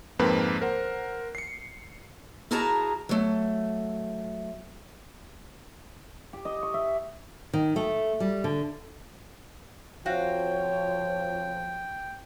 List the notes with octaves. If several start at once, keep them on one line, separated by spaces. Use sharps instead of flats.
F2 G#2 F3 A#3 C4 B4
A#4 C5 F#5
C7 C#7
E4 F#4 G#4 A#4 A5 A#5
F#3 A3
G4
D#5
C#6
E5
D#3
A3
G3
D3
F2 F3 F#4 C#5 F5 G5